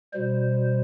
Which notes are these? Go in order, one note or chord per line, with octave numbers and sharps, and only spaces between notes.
B2 G3 C5